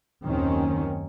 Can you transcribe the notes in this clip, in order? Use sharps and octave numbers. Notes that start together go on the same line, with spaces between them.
F#1 D#2 A#2 D#3 C4 C#4